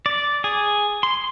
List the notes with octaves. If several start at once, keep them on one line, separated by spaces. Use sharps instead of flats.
D5
G#4
C6